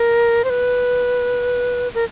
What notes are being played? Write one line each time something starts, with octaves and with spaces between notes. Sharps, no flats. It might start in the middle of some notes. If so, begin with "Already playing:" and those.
Already playing: A#4
C5
B4
A#4